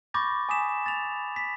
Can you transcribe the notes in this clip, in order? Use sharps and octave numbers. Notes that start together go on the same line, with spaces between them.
B5 C#6 D6 G6 A6 A#6
G#5 D6 D#6 B6 E7
A6 F7
B5
B6